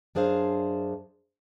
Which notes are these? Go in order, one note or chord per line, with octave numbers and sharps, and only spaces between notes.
F#2 D4 G#4 C5 F5